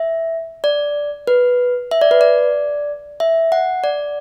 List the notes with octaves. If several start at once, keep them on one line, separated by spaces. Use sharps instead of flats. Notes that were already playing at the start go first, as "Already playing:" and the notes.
Already playing: E5
D5
B4
E5
D5
B4
D5
E5
F#5
D5